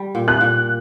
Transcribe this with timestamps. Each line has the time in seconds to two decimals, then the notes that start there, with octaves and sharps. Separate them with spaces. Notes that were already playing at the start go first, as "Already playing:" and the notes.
Already playing: G3
0.15 A#2
0.28 F#6
0.41 A#2